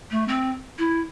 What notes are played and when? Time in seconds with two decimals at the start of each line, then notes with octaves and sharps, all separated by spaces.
0.11 A3
0.28 C4
0.79 E4